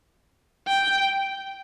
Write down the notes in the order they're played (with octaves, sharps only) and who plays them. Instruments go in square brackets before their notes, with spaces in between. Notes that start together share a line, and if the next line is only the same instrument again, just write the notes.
[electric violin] G5